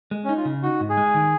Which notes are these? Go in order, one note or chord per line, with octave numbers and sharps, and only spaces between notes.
G#3
C#4
D#4
F4
C#3
D#4 F#4
G#2
G#4
G#3
D#3